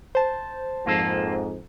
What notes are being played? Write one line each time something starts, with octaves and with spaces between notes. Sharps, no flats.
C5 A5
F2 G#2 A#3 F4 A4